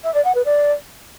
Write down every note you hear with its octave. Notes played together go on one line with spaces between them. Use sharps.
E5
D5
F#5
B4
D5